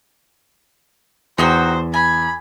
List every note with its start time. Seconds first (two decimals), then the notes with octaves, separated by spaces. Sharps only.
1.38 E2 D#4 F#4 C5 G5
1.94 G#5 B5